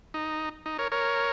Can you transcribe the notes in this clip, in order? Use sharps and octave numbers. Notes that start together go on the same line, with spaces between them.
D#4
D#4
A#4 C#5
A#4 C#5